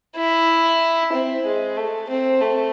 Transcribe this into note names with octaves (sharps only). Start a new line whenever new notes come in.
E4
C4
G#3
A3
C4
A3